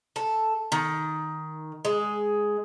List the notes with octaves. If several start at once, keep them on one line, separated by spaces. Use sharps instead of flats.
A4
D#3
G#3